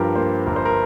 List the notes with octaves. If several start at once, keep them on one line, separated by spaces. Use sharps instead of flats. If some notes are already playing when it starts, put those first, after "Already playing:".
Already playing: G2 F3 G4 A#4
A#3 C5
G1 A#4
C5
A#4